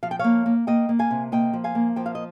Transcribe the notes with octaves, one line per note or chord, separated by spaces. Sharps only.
F3 F5
G5
A#3 C#5 F5
A#3
A#3 D#5 G5
A#3
F5 G#5
C3
A#3 D#5 G5
F3
F5 G#5
A#3
F3 G5
F5
D#5